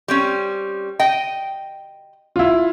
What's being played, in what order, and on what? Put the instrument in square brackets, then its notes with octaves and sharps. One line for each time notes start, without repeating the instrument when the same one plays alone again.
[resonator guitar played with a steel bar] G3 C4 C#4
D#5 G5
[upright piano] E4 F4